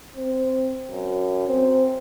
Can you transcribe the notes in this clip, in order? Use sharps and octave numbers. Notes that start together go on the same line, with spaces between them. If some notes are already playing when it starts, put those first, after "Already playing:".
C4
F#2
C4